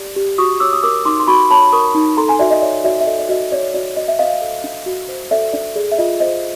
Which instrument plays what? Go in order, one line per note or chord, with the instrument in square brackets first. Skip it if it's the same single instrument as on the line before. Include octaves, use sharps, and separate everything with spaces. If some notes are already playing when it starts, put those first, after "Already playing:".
Already playing: [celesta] G4 D5
G4
F#4 C#6 D#6
C#5 D6 E6
D#6
A#4 D6 E6
D#4 C6 D6
C6
F#4 B5 C#6
C#5 A5 B5
A#4 C#6 D#6
D#4
A4 A#5 C6
G#5 A#5
F#4 D5 E5
D#5
C#5 D5 E5
F#4 D5 E5
E5
A4 D#5
D5
F#4 D#5
C#5 D5
F#4 D5
F#4 D#5
E5
C5 D#5 F5
A4
D4
F#4
C5
A4 D5 E5
D4 D5
G#4 D5
E5
F4 D#5
C5 D#5